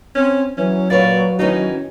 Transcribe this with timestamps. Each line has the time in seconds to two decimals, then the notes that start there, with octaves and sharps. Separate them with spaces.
0.15 C4 C#4
0.57 E3 F#3 C#4
0.90 A#2 F4 B4 C#5 D5
1.39 D#3 E3 C#4 D#4 F#4